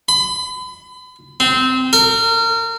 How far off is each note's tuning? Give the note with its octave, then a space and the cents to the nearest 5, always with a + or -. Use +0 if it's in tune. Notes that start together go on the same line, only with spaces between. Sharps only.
B5 +35
C4 -20
A#4 -30